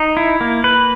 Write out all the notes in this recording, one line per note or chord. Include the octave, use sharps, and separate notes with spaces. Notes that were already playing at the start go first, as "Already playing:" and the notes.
Already playing: D#4
E4
A#3
B4